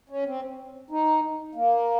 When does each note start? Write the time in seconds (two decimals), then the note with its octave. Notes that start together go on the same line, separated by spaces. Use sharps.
0.10 C#4
0.26 C4
0.91 D#4
1.55 A#3